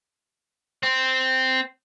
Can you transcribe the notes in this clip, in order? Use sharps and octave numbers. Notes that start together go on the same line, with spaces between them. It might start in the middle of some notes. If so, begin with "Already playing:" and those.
C4